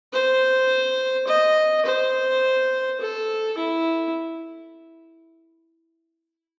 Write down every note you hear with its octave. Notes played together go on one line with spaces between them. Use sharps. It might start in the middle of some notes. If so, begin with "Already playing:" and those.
C5
D#5
C5
A4
E4